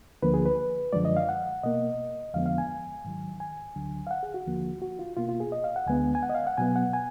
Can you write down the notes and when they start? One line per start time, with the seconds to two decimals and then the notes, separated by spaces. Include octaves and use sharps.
0.22 D2 D3 F3 A#3 B4
0.34 G#4
0.45 B4
0.93 F#2 D3 F3 G#3 D5
1.05 D#5
1.16 F5
1.29 F#5
1.63 B2 A#3 D#5
2.34 F2 D3 F3 G#3 B3 F5
2.46 F5
2.58 G#5
3.05 G#2 D#3 F#3
3.40 G#5
3.76 D2 D3 F#3
4.07 F5
4.11 F#5
4.23 G#4
4.34 F#4
4.46 D#2 D3 F3 A#3
4.82 F#4
4.99 F4
5.17 B2 A#3 F4
5.29 F4
5.40 G#4
5.52 D#5
5.64 F5
5.76 F#5
5.87 D2 D3 G#3 B3 G#5
6.15 G#5
6.23 F#5
6.29 D#5
6.35 F5
6.47 F#5
6.58 B2 F#3 B3 G#5
6.76 F#5
6.93 G#5